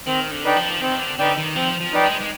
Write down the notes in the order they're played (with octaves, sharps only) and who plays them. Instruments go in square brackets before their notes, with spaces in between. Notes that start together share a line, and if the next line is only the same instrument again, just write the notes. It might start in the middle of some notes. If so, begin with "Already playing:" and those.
[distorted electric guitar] D#3 [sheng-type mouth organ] C4
[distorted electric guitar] D3
[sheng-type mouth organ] D#4 B4 D5 G5
[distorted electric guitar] F3
[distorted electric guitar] D#3 [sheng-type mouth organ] C4
[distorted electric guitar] D3
[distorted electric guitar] D3 [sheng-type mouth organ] D#4 B4 D5 G5
[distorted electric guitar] D#3
[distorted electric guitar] F3 [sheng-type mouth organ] C4
[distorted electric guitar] F3
[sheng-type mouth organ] D#4 B4 D5 G5
[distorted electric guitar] G#3
G#3